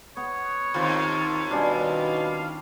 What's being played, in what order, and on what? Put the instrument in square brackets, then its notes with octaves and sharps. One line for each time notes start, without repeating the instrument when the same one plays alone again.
[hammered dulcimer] B3 [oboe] C#5
[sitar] D#2 [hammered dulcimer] C4 F4 C5
[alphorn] B2 [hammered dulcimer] G3 C#4 D4 [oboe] F5